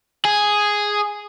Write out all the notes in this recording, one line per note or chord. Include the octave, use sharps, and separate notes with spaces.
G#4